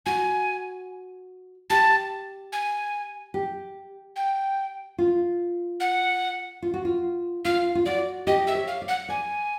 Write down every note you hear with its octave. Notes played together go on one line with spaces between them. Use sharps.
F#4 G#5
G4 A5
G#5
G4
G5
F4
F#5
F4
F#4
F4
F4 F5
F4
F#4 D5
G4 D#5
E5
C#5
F5
D5
F#5
D5 G#5